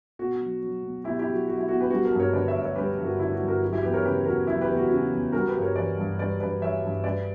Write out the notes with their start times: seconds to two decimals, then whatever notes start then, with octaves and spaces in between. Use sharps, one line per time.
0.19 B2 F#4
0.40 F#3
0.63 F#3
0.83 B2
1.04 B2 E4 G4
1.19 E4 G4
1.27 F#3
1.33 F#4
1.47 F#3 F#4
1.58 E4
1.68 B2 F#4
1.80 G4 B4
1.90 G3 F#4
2.04 F#4 A#4
2.12 G2
2.20 A#4 C#5
2.33 D3 B4 D5
2.47 C#5 E5
2.55 G2
2.62 C#5 E5
2.76 G3 G4 B4
2.97 G2
3.04 F#4 A#4
3.19 D3 E4
3.33 F#4
3.40 G2
3.47 F#4 A#4
3.62 F#3 F#4
3.72 E4 G4
3.83 E2 G4 B4
3.93 A#4 C#5
4.05 C#3 G4 B4
4.26 E2 F#4 A#4
4.47 F#3 E4 G4
4.61 G4 B4
4.69 E2
4.77 F#4
4.90 C#3 F#4
5.12 E2
5.32 G3 F#4 A#4
5.47 G4 B4
5.55 G2
5.62 A#4 C#5
5.76 E3 B4 D5
5.97 G2
6.19 G3 B4 D5
6.40 G2 B4 D5
6.61 E3 C#5 E5
6.83 G2
7.04 G3 B4 D5